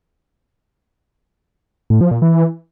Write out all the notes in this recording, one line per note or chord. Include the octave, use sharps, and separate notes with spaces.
A2
F3
A#2
E3